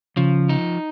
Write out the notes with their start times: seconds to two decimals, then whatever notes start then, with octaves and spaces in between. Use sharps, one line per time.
0.17 C#3 F3
0.49 D#4